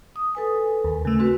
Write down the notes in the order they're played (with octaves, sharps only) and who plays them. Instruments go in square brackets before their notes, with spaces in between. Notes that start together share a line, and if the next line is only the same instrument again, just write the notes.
[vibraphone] D#6
A4 B4 G#5
[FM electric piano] D#2
C#3 A3
[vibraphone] C4 F#4 B4